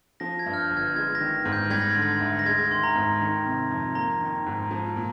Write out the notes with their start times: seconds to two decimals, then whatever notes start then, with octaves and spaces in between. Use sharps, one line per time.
0.20 F3 A#6
0.39 G#6
0.46 G2
0.54 F6
0.58 G6
0.71 G1
0.77 G#6
0.96 G#3 G#6
1.15 A#6
1.21 D#3
1.45 G#2
1.53 G6
1.70 G3 G#6
1.81 A#6
1.91 D3 G#6
2.20 D2
2.39 A#6
2.46 G#3 G#6
2.71 D#3 C6
2.84 A#5
2.95 G#2
3.21 D#3
3.46 C3
3.71 F2
3.95 A#3 A#5
4.21 D#3
4.46 G#2
4.71 F3
4.96 A#2